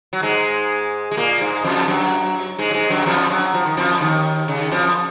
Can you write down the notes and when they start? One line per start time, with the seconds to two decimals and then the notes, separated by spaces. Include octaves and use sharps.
0.13 F#3
0.22 G#2 G#3
1.11 G#3
1.17 A#2 A#3
1.41 G#2 G#3
1.64 F2 F3
1.88 F#2 F#3
2.58 G#2 G#3
2.71 F#3
2.74 G#2 G#3
2.90 F#2 F#3
3.06 F2 F3
3.30 F#2 F#3
3.54 F3
3.66 D#3
3.77 F2 F3
4.01 D#2 D#3
4.48 C#3
4.60 D#3
4.72 F2 F3